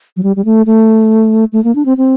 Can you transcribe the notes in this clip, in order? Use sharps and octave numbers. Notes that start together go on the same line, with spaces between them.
F#3
G3
G3
A3
A3
A3
A#3
D4
C4
C4